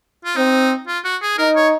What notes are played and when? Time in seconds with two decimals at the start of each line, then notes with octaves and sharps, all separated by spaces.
0.25 F4
0.36 C4 D#4
0.87 F4
1.04 F#4
1.22 G#4
1.38 D#4 A#4
1.56 C#5